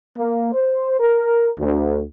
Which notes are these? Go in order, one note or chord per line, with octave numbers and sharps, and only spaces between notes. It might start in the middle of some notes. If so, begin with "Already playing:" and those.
A#3
C5
A#4
D2